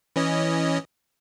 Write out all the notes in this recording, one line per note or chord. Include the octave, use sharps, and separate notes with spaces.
E3 C#4 D#5